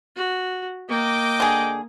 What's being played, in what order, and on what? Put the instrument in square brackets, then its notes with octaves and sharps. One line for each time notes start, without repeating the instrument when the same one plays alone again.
[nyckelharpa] F#4
[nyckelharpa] A#3 [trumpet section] D#5 G5 D6
[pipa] D3 G#4